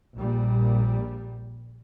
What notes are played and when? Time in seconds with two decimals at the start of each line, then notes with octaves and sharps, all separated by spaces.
0.16 A#1 A#2 G3